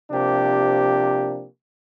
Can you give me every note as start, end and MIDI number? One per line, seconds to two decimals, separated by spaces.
0.11 1.45 48
0.11 1.45 53
0.11 1.45 58
0.11 1.45 62
0.11 1.45 67